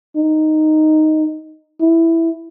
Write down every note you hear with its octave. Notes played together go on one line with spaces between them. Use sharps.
D#4
E4